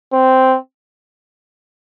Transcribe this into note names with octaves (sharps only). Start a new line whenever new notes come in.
C4